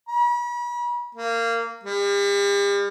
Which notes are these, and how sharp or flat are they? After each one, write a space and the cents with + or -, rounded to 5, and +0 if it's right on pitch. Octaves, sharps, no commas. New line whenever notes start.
B5 -40
A#3 -20
G3 +40